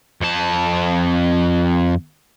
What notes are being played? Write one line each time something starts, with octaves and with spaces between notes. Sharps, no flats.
F2 A5